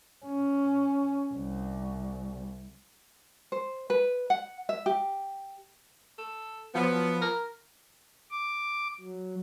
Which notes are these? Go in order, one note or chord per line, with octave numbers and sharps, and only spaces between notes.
C#4
C2
C5
B4
F#5
E5
G4
A4
F3 F#3 B3
A#4
D6
F#3